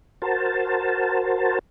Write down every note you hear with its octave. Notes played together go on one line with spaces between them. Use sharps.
F#4 A#4 C5 A5